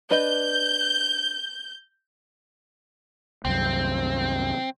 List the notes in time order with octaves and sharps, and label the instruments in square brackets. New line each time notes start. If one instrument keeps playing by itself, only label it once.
[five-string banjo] D4 B4 D#5 [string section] G6
[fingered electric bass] C2 F#2 [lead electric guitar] C4